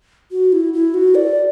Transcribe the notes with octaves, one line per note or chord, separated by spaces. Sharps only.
F#4
E4
E4
F#4
D5